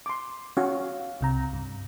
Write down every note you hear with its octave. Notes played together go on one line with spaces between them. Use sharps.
C6 D6
C#4 F#4 F5
C2 C3 A#5
G2